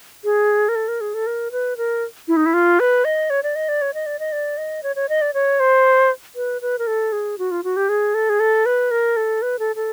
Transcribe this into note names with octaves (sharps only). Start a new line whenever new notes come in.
G#4
A#4
A4
A#4
G#4
A4
A#4
B4
A#4
E4
D#4
E4
F4
B4
D#5
C#5
D5
D#5
D5
C#5
D#5
D5
D#5
D5
D#5
C#5
C#5
D#5
D5
C#5
C5
B4
B4
A#4
A4
G#4
F#4
F4
F#4
G4
G#4
A4
G#4
A4
B4
A#4
A4
B4
A4
A4